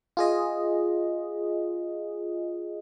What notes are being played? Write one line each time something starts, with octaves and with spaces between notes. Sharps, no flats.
F4 G#4 D#5